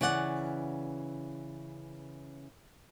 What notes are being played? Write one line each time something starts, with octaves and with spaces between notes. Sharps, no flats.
C#3 E3 D5 F#5